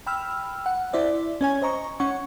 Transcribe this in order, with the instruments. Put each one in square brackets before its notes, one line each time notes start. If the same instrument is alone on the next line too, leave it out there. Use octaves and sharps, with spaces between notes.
[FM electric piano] G5 B5 E6 F6
F#5
E4 C5 D5 E5
C#4 C#5 G#5
C5 D#5 A#5 C#6
C#4 F#5 C#6